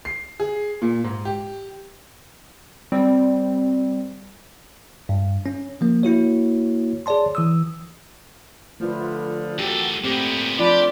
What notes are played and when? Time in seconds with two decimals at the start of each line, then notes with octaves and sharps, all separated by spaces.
0.05 C7
0.40 G#4
0.82 A#2
1.04 G#2
1.25 G4
2.92 G3 C4
5.09 G2
5.46 C#4
5.81 F3 A#3
6.03 A#3 E4 F#4 C#5
7.06 G#4 C#5 D5 A5 C6
7.35 E3 D#6 E6
8.80 D3 F3 A3 F4 B4
9.58 F#2 F#4 G4 A4
10.04 A#2 A3 B3 C4 G4
10.59 F3 D4 F4 G4 D5 B5